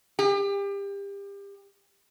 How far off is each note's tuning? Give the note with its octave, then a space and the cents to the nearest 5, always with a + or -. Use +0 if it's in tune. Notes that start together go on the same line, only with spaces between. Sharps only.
G4 +30